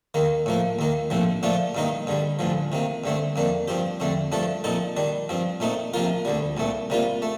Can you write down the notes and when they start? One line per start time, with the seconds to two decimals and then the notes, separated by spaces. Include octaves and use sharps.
0.14 D#2 D#3 A#3
0.46 A2 F3 A#3
0.79 D#2 D#3 A#3
1.10 A#1 A2 F3 C4
1.43 A#2 F3 A3 D4 F4
1.75 G2 D#3 A#3 D#4
2.07 G2 D3 G3
2.39 A1 G2 D3 F3
2.72 C3 D#3 A#3
3.04 G2 D3 A3 C4
3.36 F2 D#3 A#3 D4
3.68 G2 F3 C4 G4
4.00 F2 D3 A3 C4
4.32 G2 F3 A3 D4 A4
4.64 A#2 F3 C4 D#4 A4
4.97 D#3 G3 D4
5.29 G2 F3 C4
5.60 A#2 A3 C4 D#4
5.94 C3 F3 A#3 F4 A#4
6.25 D2 D3 G3
6.57 C2 A#2 A3
6.90 C3 G3 A#3 F4
7.22 A3